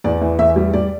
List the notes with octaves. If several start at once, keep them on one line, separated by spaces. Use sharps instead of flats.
E2 D5
E3
E2 E5
G3
G3 D5